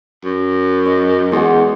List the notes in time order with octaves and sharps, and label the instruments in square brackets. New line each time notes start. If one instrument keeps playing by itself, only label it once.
[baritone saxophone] F#2
[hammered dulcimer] C#5 D#5
[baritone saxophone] E2 [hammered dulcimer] G#3 F#4